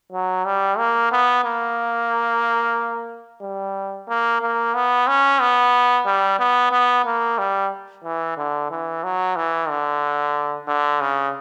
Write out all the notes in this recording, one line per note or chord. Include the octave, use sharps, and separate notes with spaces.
F#3
G3
A#3
B3
A#3
G3
A#3
A#3
B3
C#4
B3
G3
B3
B3
A#3
G3
E3
D3
E3
F#3
E3
D3
D3
C#3